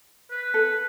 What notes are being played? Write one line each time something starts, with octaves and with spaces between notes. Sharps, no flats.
B4
A4